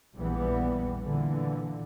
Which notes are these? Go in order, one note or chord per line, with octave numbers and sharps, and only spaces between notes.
A#1 E2 E3 G3 B3
A#2 D3 E3